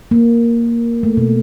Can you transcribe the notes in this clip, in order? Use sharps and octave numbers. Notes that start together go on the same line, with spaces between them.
A#3
A3
B2